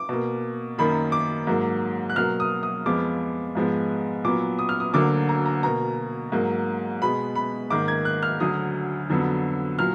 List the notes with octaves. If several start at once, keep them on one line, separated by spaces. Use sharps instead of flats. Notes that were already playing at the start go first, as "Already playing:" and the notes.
Already playing: D6
B2 A#3
F#2 D#3 A#3 B5
D6
G#2 F#3 A#3
F#6
B2 F#3 A#3 F6
D#6
D#6
F2 F3 G#3 B3 D6
G#2 F3 G#3 B3
A#2 F#3 B3 D6
D#6
F6
D#6
D2 D3 F#3 A#3 D6
A#5
A#5
B2 A#3 A#5
G#2 F#3 A#3
B2 G#3 B3 B5
B5
G#2 D#3 A#3 D6
G#6
F#6
F6
D2 D3 F#3 D#6
F2 D3 F#3 B3
A#2 F#3 F6